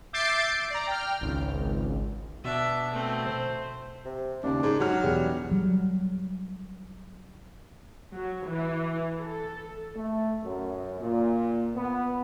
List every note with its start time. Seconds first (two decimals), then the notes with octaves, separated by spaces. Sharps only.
0.13 E5 D6 G6 A6 C7 D7
0.70 D5 A#5
0.87 G5 F6
1.21 G#1 C#2
2.44 B2 D4 E5
2.92 A3 C4
3.26 C5
4.05 C3
4.44 D#2 C#3 D4
4.63 G#2
4.79 F#3 D#4 F#4 F6
5.03 E1 E2 G3 G#4
5.51 F#3 G3
8.15 F#3
8.49 E3
9.21 A4
9.95 A3
10.43 F#2
11.00 A#2
11.76 B3